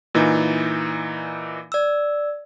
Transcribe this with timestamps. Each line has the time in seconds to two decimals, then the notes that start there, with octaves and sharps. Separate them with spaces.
0.14 A#2 E3 D#4
1.72 D5 E6